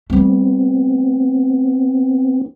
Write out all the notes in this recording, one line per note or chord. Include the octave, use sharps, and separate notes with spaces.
G3 A3 B3 C4